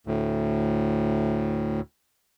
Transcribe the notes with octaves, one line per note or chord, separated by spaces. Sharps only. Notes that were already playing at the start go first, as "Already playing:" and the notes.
D2 A2